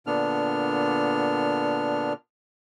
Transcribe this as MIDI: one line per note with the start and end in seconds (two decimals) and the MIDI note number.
0.07 2.13 46
0.07 2.13 50
0.07 2.13 59
0.07 2.13 62
0.07 2.13 89